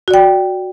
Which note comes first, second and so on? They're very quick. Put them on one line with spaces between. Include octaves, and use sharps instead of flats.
F#4 D5 G5